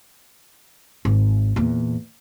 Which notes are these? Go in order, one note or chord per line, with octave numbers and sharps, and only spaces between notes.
G#1
E2 A#2